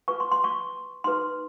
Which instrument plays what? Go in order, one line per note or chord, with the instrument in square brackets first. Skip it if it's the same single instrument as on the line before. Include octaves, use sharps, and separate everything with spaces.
[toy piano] F4 G#4 B4 C#6
C6
C6
C#6
D#4 G#4 B4 C6